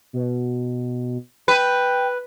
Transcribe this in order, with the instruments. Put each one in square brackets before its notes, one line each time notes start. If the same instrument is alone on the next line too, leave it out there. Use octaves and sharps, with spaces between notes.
[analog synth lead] B2
[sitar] B4 [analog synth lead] G5